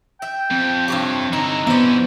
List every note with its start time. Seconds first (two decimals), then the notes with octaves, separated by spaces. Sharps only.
0.22 E5 G5
0.51 F2 C4
0.88 G2 C3 G4 C#5
1.33 D3 D#4 E4 A#5
1.67 E3 B3 C#4 E4 C5 D5